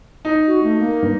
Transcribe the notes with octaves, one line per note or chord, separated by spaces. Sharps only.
D#4
F#4
A3
A#3
G2